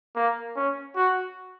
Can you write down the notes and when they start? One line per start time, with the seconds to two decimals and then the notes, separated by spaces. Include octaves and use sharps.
0.16 A#3
0.56 C#4
0.96 F#4